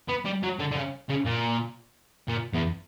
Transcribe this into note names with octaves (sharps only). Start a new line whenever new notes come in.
B3
G3
F#3
D3
D3
C#3
C#3
A#2
A#2
E2